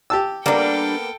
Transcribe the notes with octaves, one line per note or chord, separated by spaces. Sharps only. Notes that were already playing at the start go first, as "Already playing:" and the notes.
G4 A5 E6
G3 A#3 B3 D4 A4 A#4 G5